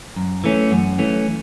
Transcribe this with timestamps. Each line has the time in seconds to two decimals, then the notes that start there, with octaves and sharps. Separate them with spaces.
0.16 F#2
0.44 E3 A3 C#4
0.71 F#2
0.98 E3 A3 C#4